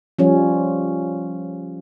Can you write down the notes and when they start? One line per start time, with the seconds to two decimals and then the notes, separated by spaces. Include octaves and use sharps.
0.19 F3 G3 C#4